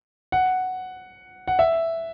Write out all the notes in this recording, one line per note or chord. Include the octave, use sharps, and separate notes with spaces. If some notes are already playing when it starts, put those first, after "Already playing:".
F#5
F#5
E5